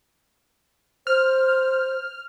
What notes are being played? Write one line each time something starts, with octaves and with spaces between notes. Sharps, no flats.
C5 F6